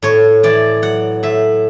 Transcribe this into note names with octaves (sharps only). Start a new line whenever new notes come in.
A2 C#5
E3 D5
F#3 F#5
A2 E5